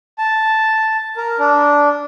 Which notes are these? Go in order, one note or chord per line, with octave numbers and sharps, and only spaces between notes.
A5
A#4
D4